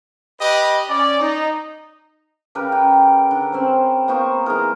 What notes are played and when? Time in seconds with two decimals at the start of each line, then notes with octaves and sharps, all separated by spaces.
0.40 G4 B4 D#5 B5
0.88 C#4 D5
1.19 D#4
2.55 C#3 G4 A#4 B4
2.72 G5
3.31 D3
3.52 C4 C#4 C5
4.08 A#3 B3 C5 C#6
4.46 E3 G#3 G#4 A#4